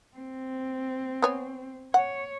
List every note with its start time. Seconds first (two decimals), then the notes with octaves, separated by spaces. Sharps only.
0.17 C4
1.22 B3 C#5 G#5
1.94 C#5 F#5